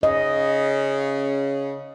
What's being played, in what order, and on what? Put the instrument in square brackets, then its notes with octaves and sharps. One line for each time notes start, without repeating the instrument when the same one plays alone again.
[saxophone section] C#3 [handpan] D#5